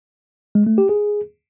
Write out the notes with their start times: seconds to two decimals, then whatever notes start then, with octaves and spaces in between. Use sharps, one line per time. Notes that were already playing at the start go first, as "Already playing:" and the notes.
0.55 G#3
0.67 A3
0.78 G4
0.89 G#4